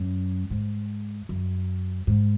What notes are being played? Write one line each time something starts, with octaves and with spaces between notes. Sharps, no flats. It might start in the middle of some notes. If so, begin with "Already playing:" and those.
Already playing: F#2
G#2
F#2
G#2